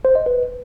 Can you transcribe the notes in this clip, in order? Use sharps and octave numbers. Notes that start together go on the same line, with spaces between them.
C5
D#5
B4